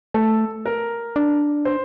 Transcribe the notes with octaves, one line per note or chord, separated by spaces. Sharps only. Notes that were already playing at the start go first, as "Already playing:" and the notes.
A3 A4
A#4
D4
C5